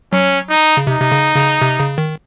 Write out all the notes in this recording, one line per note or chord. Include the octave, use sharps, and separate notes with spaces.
F#3 C#4
D#4
C#3
C3 D#4
C3
C#3
C#3
C3
C#3
D#3